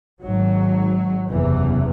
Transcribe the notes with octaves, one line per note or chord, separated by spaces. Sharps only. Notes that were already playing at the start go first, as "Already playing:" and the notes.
G#1 G#2 F#3
F#1 E2 C3 E3